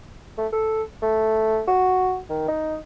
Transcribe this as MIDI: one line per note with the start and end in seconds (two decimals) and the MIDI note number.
0.38 0.47 57
0.53 0.82 69
1.02 1.62 57
1.68 2.19 66
2.30 2.48 51
2.48 2.76 63